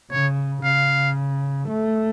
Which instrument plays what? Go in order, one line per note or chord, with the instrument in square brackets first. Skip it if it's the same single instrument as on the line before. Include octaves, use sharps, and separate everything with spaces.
[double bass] C#3 [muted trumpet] C#5
[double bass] C#3 [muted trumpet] F5
[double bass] A3